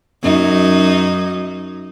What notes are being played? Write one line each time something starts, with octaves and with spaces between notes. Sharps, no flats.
F#2 D#4